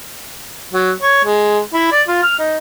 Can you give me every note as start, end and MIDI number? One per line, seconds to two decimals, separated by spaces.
0.73 0.91 54
1.02 1.23 73
1.25 1.59 56
1.73 1.89 64
1.92 2.02 74
2.08 2.18 65
2.23 2.35 89
2.39 2.58 63